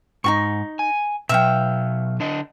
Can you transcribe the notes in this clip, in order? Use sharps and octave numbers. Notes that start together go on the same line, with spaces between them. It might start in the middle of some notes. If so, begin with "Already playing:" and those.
G#2 D#4 F#4 C#6
G#5
B2 F#3 E5 F5 G5
D3 D4 D#5